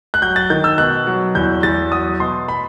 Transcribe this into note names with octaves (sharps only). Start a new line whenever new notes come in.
F#6
F#3 G6
A6
D#3 G6
E6
B2 F#6
F#3
E2 G6
E2 A6
F#3 D#6
B2 C6
B5